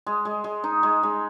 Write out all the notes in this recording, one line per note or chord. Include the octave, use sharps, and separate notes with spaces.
G#3
G#3
G#3
D#4
G#3
G#3